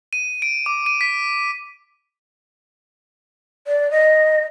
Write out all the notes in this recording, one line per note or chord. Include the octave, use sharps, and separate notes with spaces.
D#7
D7
D6
D#7
B6
D5
D#5